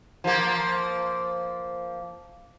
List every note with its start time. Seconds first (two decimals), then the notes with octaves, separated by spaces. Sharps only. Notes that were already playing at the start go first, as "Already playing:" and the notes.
0.24 F3 A#3